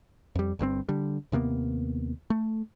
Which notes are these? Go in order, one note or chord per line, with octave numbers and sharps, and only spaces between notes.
F2 G3
G1 G2 A#2 C4
D3 G3
D#2 C3 A#3 B3
A3